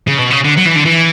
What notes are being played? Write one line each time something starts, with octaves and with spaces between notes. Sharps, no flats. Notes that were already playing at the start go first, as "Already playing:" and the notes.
C#3
B2
C#3
D3
F#3
E3
D3
E3